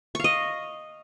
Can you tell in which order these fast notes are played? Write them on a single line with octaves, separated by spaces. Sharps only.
C#6 F5 D#5